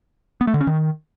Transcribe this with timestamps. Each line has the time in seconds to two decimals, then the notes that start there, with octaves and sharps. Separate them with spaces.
0.41 B3
0.47 A3
0.54 D3
0.61 C#4
0.67 D#3